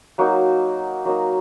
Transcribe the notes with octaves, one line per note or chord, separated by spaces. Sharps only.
F#3 A#3 D#4 F#4
F#3 A#3 D#4 F#4